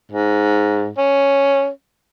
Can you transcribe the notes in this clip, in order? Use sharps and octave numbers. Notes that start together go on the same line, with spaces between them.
G#2
C#4